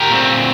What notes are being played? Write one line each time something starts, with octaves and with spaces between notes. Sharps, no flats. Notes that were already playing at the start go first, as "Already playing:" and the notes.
Already playing: G4 A#4
A#2 A3 C4